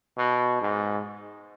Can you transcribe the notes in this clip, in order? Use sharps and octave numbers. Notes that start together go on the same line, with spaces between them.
B2
G#2